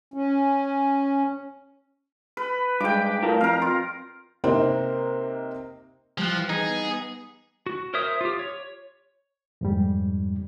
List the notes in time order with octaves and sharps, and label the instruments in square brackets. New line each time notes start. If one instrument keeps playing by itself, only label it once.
[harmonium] C#4
[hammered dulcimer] B4
[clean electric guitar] G2 G#3 [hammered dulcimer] G5 D6
[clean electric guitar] A2 A#4 F5
[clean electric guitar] F2 [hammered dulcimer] A#4 F5
[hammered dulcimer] F4
[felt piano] C3 A#3 C4 D#4 A#4
[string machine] E3 [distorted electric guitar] F3 [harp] G3 F#6
[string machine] B3 [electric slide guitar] D#4 [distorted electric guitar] G#4
[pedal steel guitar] F#4
A#4 C5 C#5 E5 D#6
F4 G4
C#5
[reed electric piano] F2 G#2 G3